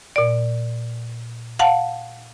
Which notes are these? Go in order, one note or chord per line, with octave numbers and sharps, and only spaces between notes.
A#2 D5
F5 F#5 A5